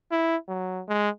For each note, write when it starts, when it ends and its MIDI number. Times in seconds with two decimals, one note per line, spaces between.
0.11 0.37 64
0.48 0.82 54
0.88 1.10 56